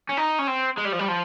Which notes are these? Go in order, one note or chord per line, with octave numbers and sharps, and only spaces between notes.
C#4
D#4
C#4
C4
G#3
G3
F3
G3
F3